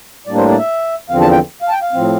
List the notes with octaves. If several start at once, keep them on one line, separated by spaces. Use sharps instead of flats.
A2 G3 A#3 D4 D5
C5
D5
E5
E2 D3 F3 C4 F5
A5
G5
F5
A5
G5
F5
A2 F3 C4